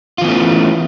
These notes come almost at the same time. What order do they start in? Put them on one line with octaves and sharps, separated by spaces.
F4 E3 B3 A3 C#4